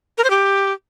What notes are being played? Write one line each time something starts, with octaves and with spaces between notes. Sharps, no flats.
A#4
C5
G4